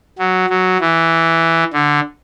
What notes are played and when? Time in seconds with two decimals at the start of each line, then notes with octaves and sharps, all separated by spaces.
0.18 F#3
0.49 F#3
0.80 E3
1.73 D3